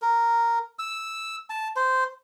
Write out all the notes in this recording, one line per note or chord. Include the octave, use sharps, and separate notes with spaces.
A#4
E6
A5
C5